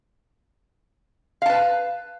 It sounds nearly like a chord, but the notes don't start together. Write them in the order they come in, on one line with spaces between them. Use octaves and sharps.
F5 A5 B4